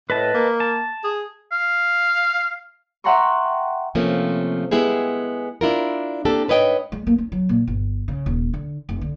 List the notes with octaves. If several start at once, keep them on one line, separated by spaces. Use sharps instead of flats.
A2 B4 D#5 A5
A#3
A5
G#4
F5
E5 F#5 G5 A#5 C6 C#6
C3 F3 A3 A#3 C4 C#4
G#3 B3 E4 G4 G#4
D4 E4 F4 A#4
A#3 C4 D4 G4 A4
G#2 B4 C#5 D#5 G5
G#3
A#3
C#4
F#3
A#2
G1
C#3
D#1
D3
F1
D3